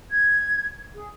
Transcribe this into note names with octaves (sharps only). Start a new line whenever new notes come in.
G#6
G#4